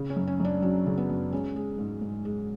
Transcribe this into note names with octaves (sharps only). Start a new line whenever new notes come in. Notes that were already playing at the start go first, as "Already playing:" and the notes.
Already playing: C#3
C#4
F#2
C#4
F#2 D4
F#3 C#4
C#3
B3
F#2
G#3 C#4
G#3
G#2
G#2
G#3